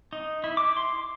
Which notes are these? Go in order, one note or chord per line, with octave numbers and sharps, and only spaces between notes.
D#4
E4
D6
C6